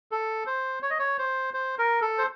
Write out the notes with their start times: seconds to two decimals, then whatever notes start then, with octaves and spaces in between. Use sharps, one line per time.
0.11 A4
0.47 C5
0.82 C#5
0.90 D#5
0.99 C#5
1.18 C5
1.54 C5
1.78 A#4
2.02 A4
2.18 C5